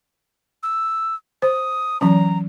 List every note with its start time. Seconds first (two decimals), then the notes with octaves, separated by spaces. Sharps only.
0.63 E6
1.42 C5 D#6
2.01 E3 F#3 C#4 A#5